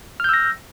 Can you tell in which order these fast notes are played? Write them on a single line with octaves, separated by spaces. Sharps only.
F6 G6 E6 A#6